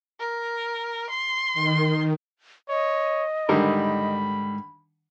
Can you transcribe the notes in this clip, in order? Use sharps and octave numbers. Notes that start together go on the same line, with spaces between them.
A#4
C6
D#3
C#5 D#5
G#2 D3 D#3 G3 A#4 B5